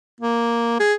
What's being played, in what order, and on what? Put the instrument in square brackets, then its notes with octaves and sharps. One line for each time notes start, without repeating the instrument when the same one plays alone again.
[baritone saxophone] A#3
G#4